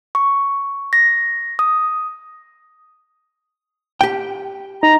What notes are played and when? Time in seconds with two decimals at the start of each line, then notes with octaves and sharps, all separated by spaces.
0.15 C#6
0.93 A#6
1.59 D#6
4.01 G4 G5
4.83 D#4 A#5